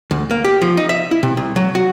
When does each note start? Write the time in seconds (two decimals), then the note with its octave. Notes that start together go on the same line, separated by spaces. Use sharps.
0.11 D2
0.31 A#3
0.44 G4
0.62 F3
0.77 D#4
0.89 E5
1.11 E4
1.23 C3
1.37 C2
1.56 F#3
1.75 F#4